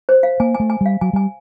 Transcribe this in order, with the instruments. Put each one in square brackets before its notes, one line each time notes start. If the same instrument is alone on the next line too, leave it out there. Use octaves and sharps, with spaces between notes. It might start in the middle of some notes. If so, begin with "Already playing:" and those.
[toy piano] C5
F5
[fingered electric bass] A#3 [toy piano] G#5
[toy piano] G#5
[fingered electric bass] A3
[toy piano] G#5
[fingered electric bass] G3 [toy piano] F5
[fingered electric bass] F#3 [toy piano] G#5
[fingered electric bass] G3 [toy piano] G#5